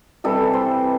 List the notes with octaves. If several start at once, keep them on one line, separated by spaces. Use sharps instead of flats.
C3 E3 G3 A4
C5